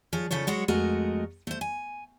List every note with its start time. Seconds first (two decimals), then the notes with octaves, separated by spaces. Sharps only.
0.13 F3 G#4 C#5
0.31 C#3 F3 A4 C#5
0.47 F#3 G#3 F#4 C#5
0.68 F2 G#3 A3 F#4 A#4 D#5
1.47 A3 C5
1.61 G#5